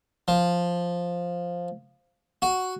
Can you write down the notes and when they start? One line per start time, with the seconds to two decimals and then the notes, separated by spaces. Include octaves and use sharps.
0.28 F3
2.42 F#4